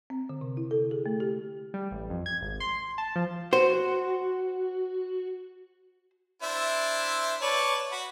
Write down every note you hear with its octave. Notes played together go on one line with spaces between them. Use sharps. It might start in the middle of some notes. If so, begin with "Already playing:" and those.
C4
D3
C3
E4
A4
G#4
A3
G4
G3
A1
F2
G#6
G#1
C6
A5
F3
F#4 C5
D4 E4 C5 E5
B4 C#5 D5 A5 C#6
F#4 B5